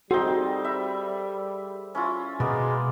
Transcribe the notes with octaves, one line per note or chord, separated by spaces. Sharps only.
G3 C4 D#4 F#4 G#4 A4 G5
E5 B5
C#4 E4 F4
B2 G#3 A#3 B3 D5